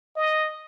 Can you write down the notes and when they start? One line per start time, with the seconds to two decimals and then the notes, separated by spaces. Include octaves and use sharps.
0.17 D#5